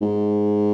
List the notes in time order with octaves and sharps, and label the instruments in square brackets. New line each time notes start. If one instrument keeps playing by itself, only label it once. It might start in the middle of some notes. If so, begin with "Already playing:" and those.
[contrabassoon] G#2